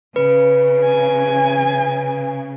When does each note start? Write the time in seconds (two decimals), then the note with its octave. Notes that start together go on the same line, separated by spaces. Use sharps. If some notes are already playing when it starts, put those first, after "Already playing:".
0.16 C#3 B4
0.83 G#5